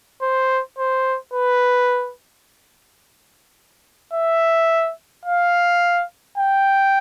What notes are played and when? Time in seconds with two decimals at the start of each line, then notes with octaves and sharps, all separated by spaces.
0.22 C5
0.78 C5
1.34 B4
4.13 E5
5.25 F5
6.38 G5